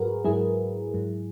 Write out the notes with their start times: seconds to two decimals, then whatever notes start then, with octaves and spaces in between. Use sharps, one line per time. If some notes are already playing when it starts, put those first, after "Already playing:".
Already playing: G#2 F#3 F#4 G#4 A#4 B4
0.24 G#2 F#3 E4 G#4
0.94 G#2 F#3